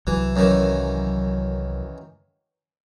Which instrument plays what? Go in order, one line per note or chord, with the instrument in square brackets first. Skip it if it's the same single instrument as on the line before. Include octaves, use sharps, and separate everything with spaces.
[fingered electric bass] C2 F#3 [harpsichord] E3
[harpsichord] F#2 D#3 E3